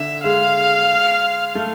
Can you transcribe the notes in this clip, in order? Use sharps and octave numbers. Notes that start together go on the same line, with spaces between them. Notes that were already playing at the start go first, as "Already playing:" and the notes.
Already playing: D3 E5
G#3 F5
A3